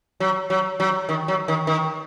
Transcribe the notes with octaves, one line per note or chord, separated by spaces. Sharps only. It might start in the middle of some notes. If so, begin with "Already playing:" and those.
F#3
F#3
F#3
D#3
F#3
D#3
D#3